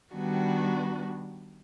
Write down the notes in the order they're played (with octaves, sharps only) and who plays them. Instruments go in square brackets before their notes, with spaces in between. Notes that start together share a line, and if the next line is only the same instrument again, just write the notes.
[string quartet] D#3 G3 B3 D4 F#4